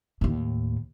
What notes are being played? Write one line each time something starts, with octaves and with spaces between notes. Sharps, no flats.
D#2 A2